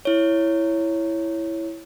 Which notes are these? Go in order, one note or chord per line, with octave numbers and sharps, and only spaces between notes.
E4 C#5